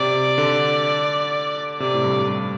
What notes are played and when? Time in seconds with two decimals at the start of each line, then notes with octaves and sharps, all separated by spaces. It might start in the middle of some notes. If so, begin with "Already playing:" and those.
Already playing: C3 D5
0.38 D3
1.79 C3 D5
1.94 A2
2.04 G2
2.27 G2